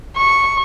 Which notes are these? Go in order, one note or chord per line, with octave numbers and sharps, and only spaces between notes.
C#6